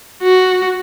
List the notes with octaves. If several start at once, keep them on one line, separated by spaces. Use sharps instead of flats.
F#4